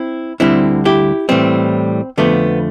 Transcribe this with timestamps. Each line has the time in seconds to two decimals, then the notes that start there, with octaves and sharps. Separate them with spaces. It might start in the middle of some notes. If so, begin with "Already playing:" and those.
Already playing: C4 E4
0.40 D2 D3 G3 C4 E4
0.85 E4 G4
1.29 A2 E3 G3 C4
2.18 F2 D3 F3 A3 B3